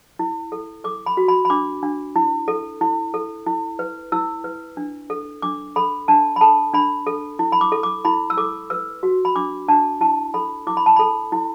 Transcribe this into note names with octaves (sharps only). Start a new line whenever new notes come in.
E4
A4
A4 D6
B5
F#4
B5
B5
D4 D6
D4
E4
A4
E4
A4
E4
B4
E4 E6
B4
D4
A4
D4 D6
A4 B5
D4 A5
B5
A4 A5
D4 B5
A4
E4
B5
D6
A4
D6
E4 B5
E6
A4 D6
B4 E6
F#4
B5
D4 D6
D4 A5
E4 A5
A4 B5
E4 D6
B5
A5
A4 B5
E4